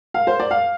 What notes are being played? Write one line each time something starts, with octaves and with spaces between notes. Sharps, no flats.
F5
C5
D5
F5